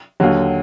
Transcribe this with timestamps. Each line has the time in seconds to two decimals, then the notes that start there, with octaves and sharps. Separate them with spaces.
0.20 D#2 D3 F#3